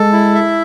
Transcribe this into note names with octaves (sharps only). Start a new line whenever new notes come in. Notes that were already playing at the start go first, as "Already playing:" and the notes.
Already playing: G#3 A4
E4
E5